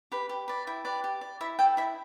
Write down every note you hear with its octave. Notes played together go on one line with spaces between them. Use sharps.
G4 B4
G4
B4 D5
E4 G5
G4 B4 D5
G4
D5
E4 E5
A4 D5 G5
E4 E5